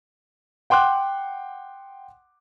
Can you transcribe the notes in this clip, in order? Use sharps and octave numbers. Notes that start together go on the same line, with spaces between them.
F#5 G5 C6 D6 F#6